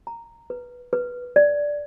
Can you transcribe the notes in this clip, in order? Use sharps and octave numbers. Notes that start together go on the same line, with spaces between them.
A#5
B4
B4
D5